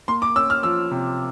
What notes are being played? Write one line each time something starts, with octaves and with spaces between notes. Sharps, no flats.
A#3 C6
D6
C#4 E6
F6
F3 E6
C3